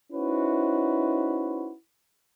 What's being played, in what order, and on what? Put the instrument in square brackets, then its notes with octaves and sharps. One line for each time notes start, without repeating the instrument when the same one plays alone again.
[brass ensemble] C#4 D#4 E4 F#4 B4 C5